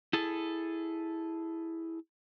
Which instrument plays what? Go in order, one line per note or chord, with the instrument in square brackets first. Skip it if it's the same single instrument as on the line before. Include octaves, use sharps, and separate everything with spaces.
[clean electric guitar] E4 G#4 A4